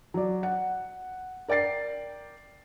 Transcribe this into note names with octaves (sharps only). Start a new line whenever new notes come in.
F#3 D5
F#5
A#4 D5 G5 A6 C7